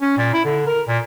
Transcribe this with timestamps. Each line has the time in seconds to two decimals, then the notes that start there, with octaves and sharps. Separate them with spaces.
0.02 C#4
0.18 A#2
0.34 E4
0.45 D3
0.67 A#4
0.88 A#2